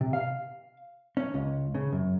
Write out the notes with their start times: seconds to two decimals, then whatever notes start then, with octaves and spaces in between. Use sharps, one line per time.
0.01 C3
0.13 F5
1.17 C#4
1.34 C#2
1.75 C#3
1.92 F#2